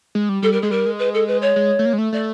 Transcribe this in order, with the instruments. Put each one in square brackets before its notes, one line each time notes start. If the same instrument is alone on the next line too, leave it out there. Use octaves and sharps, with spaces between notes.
[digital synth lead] G#3
G3
[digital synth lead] G3 [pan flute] A4
[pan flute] A#4
[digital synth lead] G#3 [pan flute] G#4
[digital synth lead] G3 [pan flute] A#4
[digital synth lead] G#3
[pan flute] B4
A4
B4
C#5
[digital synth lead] G#3
A3
A#3
G#3
A3
[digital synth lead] A3 [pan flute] D5